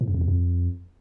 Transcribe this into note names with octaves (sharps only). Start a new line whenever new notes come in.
A2
F#2
F2
E2
F2